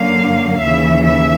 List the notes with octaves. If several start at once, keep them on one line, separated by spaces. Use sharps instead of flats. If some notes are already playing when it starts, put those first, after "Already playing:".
Already playing: F#2 D3 F#3 A#3 F5
D#2 C#3 E3 E5
E5